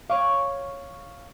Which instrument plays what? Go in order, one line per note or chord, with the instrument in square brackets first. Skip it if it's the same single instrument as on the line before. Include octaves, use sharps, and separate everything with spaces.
[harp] C#5 C#6 D6 [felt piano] F5